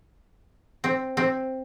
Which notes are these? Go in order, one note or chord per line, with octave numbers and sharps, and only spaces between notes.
C4
C4